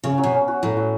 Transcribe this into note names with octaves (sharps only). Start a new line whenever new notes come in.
C#3 C#4
F#3
B2
C#4
F#4
A2 F#3
F#3